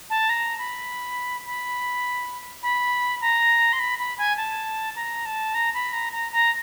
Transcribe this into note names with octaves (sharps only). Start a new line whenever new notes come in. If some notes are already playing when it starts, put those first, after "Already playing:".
A5
A#5
B5
B5
B5
A#5
C6
B5
B5
G#5
A5
A#5
A5
A#5
B5
A#5
A#5
A#5